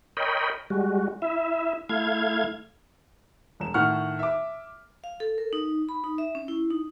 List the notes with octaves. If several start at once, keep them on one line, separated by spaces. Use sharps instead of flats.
A#4 C#5 D#5 G5 B5
G3 G#3 F#4
E4 E5
A3 E4 F5 G#6
E1 E7
A2 D#3 F#5 C#6 F6
E5 D6
F5
A4
A#4
D#4
B5
D#4
E5
C#4
E4
D#4